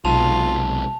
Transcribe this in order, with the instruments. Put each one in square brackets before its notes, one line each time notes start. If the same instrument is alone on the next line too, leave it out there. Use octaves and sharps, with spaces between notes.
[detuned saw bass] B1 [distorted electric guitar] C3 G#3 [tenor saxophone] F4 [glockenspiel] A5 F7